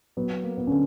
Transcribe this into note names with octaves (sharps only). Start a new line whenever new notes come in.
F#3 B3
A#3
B3
D3 C#4